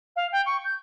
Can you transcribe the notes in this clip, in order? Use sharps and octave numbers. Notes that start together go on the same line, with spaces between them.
F5
G5
C#6
G6